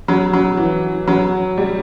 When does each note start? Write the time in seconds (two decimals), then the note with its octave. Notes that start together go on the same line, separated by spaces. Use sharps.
0.08 F#3
0.33 F#3
0.57 E3
1.08 F#3
1.58 G3